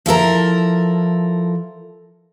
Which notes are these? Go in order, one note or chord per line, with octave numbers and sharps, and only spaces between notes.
F3 E4 A4 A#4